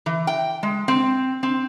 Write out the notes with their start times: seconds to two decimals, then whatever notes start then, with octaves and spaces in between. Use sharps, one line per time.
0.06 E3
0.27 G5
0.63 G#3
0.88 C4
1.43 C4